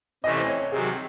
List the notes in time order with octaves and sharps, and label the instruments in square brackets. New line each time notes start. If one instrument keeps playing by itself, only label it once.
[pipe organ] C3 E3 A3 C#4 [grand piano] D#5
[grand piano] C5
C#5
[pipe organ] C3 D#3 F#3 [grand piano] G#4